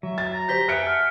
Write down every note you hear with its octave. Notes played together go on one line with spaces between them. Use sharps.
F#3 E5
A6
A#5
G4 C5 G6 B6 G7
G#4 B4 E5 F5 F#6 C#7 D7
F#5 G#5 A5 F6